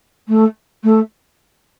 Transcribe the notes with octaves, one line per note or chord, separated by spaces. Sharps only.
A3
A3